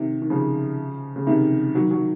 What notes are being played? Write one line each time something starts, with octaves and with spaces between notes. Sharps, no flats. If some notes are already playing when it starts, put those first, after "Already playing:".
Already playing: C3 D#3
D#3
C#3 F3
C#3
C3 D#3
D#3 F#3
D#3 F#3